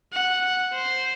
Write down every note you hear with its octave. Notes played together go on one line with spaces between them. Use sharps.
F#5
C5